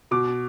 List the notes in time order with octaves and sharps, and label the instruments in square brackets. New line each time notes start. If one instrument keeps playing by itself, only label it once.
[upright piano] B2 D6